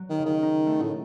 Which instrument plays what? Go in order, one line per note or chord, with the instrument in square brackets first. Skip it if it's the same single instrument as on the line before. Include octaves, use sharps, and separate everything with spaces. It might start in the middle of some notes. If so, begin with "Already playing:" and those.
Already playing: [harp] F#3
[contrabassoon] D#3
[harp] C#3
[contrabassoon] D#3
[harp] D#4
A3
[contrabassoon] A2